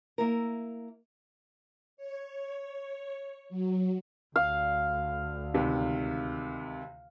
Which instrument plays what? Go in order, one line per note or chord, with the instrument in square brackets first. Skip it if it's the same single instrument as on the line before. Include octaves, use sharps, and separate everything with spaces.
[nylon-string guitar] A#3 E4 A#4
[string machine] C#5
F#3
[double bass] D2 [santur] F5
[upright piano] C#2 C3 D#3